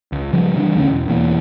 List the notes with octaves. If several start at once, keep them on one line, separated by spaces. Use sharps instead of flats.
C#2
C#3 F3 G3
C#3 E3 G3 D4
F1 D2 C4 C#4
E1
E1 E3 A#3